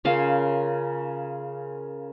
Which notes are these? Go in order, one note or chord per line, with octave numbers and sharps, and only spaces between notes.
C#3 C#4 F4 A#4 F5